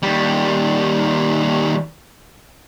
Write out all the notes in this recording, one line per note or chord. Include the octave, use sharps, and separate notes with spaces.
D#2 G3